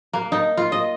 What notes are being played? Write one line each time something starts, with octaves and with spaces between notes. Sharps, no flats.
A#3
D#4
F4
D#5